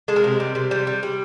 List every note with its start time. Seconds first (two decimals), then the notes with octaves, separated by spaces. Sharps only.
0.08 G#3 A4
0.16 A#4
0.24 C3
0.40 G3
0.55 C3
0.71 G3
0.87 G3
1.03 G3